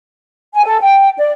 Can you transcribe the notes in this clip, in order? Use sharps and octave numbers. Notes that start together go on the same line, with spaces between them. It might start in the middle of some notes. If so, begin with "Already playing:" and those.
G#5
A4
G5
D5